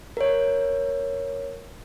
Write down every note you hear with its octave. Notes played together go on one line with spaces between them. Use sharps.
A#4 C#5